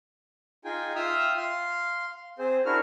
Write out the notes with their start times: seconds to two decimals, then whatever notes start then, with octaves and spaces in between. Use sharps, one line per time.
0.65 D#4 F4 G#4 G5 G#5
0.95 F4 E5 G5 D#6 F6
1.37 F5 C6
2.39 C4 G#4 C5
2.66 D4 E4 F#4 A#4 F6